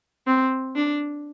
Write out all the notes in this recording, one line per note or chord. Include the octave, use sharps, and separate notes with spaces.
C4
D4